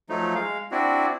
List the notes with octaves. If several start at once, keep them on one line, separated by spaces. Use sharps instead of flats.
F3 F#3 A3 D#4
G#3 F5
C4 D4 E4 F#4